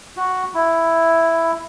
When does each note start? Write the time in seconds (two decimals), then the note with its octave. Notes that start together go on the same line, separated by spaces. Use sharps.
0.17 F#4
0.54 E4